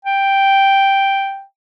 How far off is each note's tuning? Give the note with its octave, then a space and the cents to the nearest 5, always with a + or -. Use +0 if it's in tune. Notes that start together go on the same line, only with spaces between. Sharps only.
G5 +0